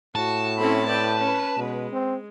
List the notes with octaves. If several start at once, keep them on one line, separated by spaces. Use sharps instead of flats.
A2 F#4 A5
C4 C#4 E4 A4 B5
B4 D5 G5
C#4
B2 G#3
C4